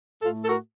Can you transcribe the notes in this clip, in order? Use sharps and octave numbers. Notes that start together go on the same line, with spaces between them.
A2 A3 F4 A4
A4
F#4 A#4